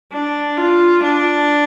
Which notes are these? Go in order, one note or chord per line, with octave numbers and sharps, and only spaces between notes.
D4
F4
D4